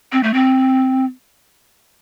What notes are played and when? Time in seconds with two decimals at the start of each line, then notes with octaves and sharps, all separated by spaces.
0.12 C4
0.23 A3
0.34 C4